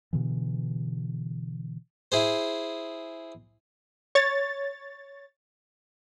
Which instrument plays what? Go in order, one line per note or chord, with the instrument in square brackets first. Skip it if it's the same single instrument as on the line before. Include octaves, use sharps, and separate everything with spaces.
[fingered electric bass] B2 D3 E3
[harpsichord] E4 G#4 C5
[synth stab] C#5 A6